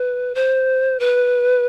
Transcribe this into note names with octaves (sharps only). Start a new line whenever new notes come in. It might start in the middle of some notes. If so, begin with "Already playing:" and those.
Already playing: B4
C5
B4